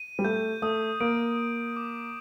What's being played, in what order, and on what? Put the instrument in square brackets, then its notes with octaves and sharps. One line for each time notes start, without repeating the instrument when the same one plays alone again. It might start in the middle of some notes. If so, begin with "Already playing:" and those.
Already playing: [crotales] D#7
[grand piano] G3
[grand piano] A3 [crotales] G6
[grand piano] A3 [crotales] D#6
[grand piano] A#3 [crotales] D7
[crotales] D#6
D6